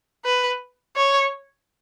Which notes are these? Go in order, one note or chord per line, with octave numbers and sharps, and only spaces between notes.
B4
C#5